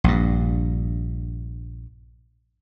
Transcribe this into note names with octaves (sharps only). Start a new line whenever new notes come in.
A#1 G2